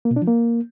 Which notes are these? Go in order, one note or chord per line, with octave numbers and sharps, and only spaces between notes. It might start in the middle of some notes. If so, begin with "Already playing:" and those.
A#3
B2
D4
F3
A#3